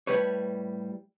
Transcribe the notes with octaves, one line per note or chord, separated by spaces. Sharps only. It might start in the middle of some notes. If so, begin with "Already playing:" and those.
A2 G3 B4 C#5